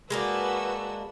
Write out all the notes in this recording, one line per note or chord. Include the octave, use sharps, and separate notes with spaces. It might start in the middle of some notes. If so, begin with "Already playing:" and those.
G#3 A#3 D4 F#4 B4 E6